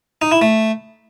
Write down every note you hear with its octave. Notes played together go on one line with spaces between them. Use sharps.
D#4
E4
A3